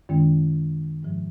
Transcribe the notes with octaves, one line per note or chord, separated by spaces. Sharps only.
F#2 D#3 G#3 C#4
G#2 F3 G#3